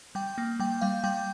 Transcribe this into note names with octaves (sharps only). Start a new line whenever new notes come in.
G3 G5
A#3
G3 G5
G3 F5
G3 G5